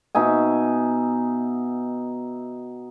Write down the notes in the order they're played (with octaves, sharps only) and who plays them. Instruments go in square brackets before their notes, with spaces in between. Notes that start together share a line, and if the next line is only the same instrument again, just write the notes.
[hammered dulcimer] B2 D#4 E5 G#5